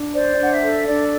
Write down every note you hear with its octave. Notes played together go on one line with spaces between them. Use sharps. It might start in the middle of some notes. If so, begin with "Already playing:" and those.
Already playing: D4
C5 D5
G5
D4 F#5
E5
A4
D4 D5